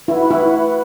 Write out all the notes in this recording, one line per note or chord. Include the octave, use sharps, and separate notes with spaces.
E4 F#4 B4 F#5 B5
E4